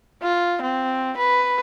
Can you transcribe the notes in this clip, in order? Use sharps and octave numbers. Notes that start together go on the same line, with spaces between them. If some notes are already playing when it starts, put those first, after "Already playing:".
F4
C4
B4